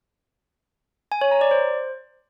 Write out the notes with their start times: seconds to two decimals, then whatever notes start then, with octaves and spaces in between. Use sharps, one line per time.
1.12 G#5
1.21 C#5
1.31 A#5
1.41 D5
1.51 C5